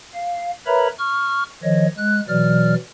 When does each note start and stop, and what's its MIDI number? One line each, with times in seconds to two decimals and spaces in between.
0.14 0.51 77
0.66 0.88 70
0.66 0.88 71
0.66 0.88 73
0.66 0.88 76
0.66 0.88 82
0.66 0.88 83
0.99 1.43 85
0.99 1.43 89
1.63 1.86 51
1.63 1.86 53
1.63 1.86 73
1.63 1.86 75
1.97 2.20 56
1.97 2.20 90
2.29 2.74 47
2.29 2.74 52
2.29 2.74 54
2.29 2.74 74
2.29 2.74 89